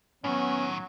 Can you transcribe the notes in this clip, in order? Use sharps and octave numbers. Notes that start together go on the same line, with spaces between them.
A2 D#3 F#3 B3 C#4